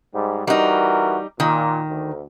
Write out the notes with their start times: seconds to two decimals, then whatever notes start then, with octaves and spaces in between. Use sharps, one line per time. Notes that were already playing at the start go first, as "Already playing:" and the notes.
0.14 G#2 G3
0.47 E3 G3 D#4 F#4 A#4
1.40 A#2 D#3
1.89 D2